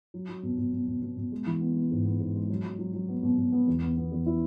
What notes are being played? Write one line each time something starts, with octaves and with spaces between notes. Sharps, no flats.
F#3
F#3
B2
B2
B2
B2
B2
B2
G#3
E3
B3
B3
G#2
B3
G#2
G#3
F#3
F#3
F#3
F#3
B3
B2
B2
B3
E2
B3
B3
E2
E4